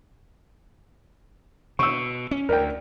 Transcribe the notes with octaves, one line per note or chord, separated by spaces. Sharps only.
B2 C#6 E6
C#4
D2 A#4 D5 G5